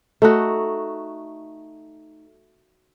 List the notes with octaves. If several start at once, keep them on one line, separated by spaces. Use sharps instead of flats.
A3 D#4 F#4